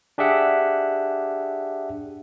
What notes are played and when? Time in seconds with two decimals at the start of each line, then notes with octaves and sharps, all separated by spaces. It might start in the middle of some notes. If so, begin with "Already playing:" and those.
0.18 D4 G4 G#4 E5 F#5